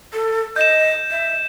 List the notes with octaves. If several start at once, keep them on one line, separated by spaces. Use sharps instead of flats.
A4
D#5 G6 E7
E5